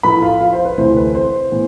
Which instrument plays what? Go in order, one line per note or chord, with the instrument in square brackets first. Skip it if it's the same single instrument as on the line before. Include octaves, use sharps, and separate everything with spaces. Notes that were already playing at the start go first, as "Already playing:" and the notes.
[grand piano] A2 F3 A3 E4 B4 B5
F4 F5
F4 F5
C5
B4
D2 C3 E3 A3 E4 C5
B4
C5
A2 E3 B3